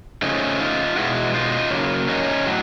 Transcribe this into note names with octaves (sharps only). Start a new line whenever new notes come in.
C#3 F3 A3 C#4 D#4
D#4 F4
B2 G#3 B3 E4 F#4
D#4 F4
C#3 F#3 A#3 C#4
C#4 D#4
A2 F#3